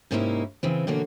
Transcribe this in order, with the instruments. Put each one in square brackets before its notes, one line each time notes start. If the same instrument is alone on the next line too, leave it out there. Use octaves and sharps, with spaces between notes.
[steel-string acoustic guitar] G#2 C3 A#3 C#4 D#4 E4
C#3 E3 C4
B2 D3 A#3 C#4 F#4